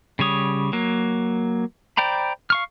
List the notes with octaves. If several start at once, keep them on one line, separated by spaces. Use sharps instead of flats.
C#3 G3 C#5 D#6
F#3 A#3
C5 D5 G5 A#5 B5
F5 C#6 F6